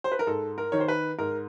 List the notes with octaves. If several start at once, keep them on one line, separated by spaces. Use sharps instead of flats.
C5
B4
A#4
G#2 A4
A#4
D#3 C#5
C5
B4
G#2 A#4